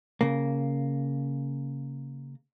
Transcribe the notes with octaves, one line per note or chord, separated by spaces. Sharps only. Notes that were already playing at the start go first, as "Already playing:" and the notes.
C#3 A#3